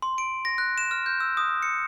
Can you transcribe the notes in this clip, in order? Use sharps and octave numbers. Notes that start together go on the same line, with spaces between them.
C6
D7
A#6
F#6
E7
F6
G6
E6
D#6
C#7